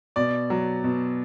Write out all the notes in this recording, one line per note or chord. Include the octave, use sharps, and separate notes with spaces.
B2 D5
F#3
B2